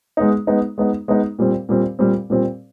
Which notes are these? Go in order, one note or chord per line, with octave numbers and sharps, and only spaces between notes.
G#3 B3 D#4
G#3 B3 D#4
G#3 B3 D#4
G#3 B3 D#4
A#2 G3 C4
A#2 G3 C4
A#2 G3 C4
A#2 G3 C4